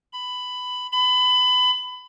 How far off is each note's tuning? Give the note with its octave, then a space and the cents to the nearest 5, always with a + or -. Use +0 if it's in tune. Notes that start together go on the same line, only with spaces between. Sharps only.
B5 +15
B5 +25